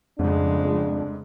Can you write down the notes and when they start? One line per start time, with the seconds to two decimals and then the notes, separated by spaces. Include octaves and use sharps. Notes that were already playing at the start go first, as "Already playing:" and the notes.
0.19 F1 F2 G#2 C#3 G#3 D4